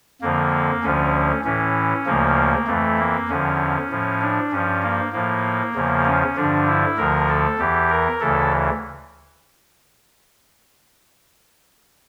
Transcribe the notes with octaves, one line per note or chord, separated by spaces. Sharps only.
F2 D3 F3 A#3
D2 D3 F3 C#4
A2 E3 C#4
D2 C#3 F3 A#3
F2 E3 A3
A#3
E2 D3 F3 C#4
A2 F3
D4
G2 F3 C#4
A#3
A2 F3 A#3
E2 C#3 F3
C#4
G2 D3 F3 D4
E4
D2 D3 F3 A#4
A4
E2 E3 G4
A#4
D2 C#3 E3 A4